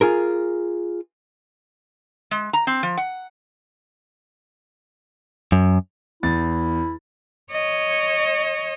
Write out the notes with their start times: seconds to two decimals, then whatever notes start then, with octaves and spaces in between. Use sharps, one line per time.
0.01 F4 G#4 A#4
2.31 G#3
2.53 A#5
2.67 C4
2.83 F3
2.97 F#5
5.52 F#2
6.23 E2 E4 A6
7.52 C#5 D#5